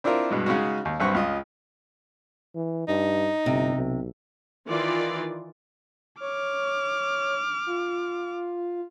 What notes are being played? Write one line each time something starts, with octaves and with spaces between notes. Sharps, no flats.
C4 D4 E4 F4 A#4
G2 B2 G#3
C#3 G#3 C#4 D#4 F#4
D#2
B1 G2 C4 F#5 C#6
C#2 F4 D#5
E3
G2 D#4
G1 C3
B1
D#3 E3 F4 D5
C#5 D6 F6
F4